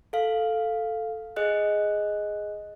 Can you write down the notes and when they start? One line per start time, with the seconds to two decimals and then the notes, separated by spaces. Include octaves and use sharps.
0.13 A4 F5
1.36 G#4 D#5 F#6